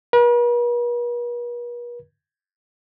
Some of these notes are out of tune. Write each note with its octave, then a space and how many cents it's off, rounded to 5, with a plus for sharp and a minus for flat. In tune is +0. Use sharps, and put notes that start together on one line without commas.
B4 -45